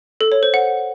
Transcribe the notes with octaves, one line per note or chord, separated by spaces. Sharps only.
A4
C#5
C5
F#5